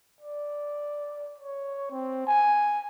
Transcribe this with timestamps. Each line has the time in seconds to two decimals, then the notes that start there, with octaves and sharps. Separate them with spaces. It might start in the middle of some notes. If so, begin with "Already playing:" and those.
0.21 D5
1.38 C#5
1.91 C4
2.27 G#5